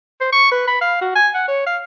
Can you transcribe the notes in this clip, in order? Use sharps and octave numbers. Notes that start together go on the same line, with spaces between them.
C5
C#6
B4
B5
F5
F#4
G#5
F#5
C#5
F5